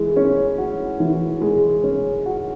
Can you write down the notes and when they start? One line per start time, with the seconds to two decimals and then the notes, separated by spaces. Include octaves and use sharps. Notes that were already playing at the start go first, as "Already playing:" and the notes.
Already playing: E3 G#3
0.16 C#4
0.58 F#4
1.00 E3
1.41 G#3
1.84 C#4
2.26 F#4